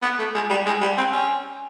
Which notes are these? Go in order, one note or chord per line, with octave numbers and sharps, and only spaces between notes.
B3
A3
G#3
G3
G#3
G3
C4
C#4